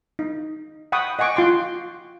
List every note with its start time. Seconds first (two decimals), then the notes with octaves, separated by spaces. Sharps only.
0.19 D#4
0.92 F#5 G5 B5 C#6 D#6
1.19 D#5 F#5 G#5 C#6 D6
1.36 F4 G5 C6 D6